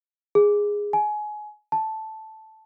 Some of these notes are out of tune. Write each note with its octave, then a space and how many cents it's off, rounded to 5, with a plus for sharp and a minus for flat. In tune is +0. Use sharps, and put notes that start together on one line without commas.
G#4 -10
G#5 +25
A5 -5